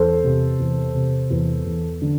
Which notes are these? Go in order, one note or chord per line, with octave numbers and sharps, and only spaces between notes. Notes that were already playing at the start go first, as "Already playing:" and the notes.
Already playing: E2 A4 C5
C3
E2
C3
E2
E2
D3